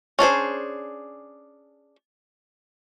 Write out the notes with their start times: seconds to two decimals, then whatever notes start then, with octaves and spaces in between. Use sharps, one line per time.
0.19 C#4 D4 G#4 C5